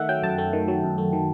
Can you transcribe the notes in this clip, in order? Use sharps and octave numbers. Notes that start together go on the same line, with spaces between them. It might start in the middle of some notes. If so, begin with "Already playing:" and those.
Already playing: D#3 A3 E5 F#5
F#3 G5
F#2 A5
A3
D#3
F#3
F#2
A3
D#3